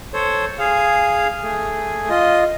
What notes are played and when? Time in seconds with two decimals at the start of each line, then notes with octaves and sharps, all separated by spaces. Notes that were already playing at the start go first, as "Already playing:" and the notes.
0.13 A4 C5 C#5
0.59 G#4 F5
1.43 A3 G#4
2.09 F4 D#5